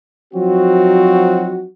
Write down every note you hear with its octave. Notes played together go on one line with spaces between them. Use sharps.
F3 F#3 C4 D#4 F#4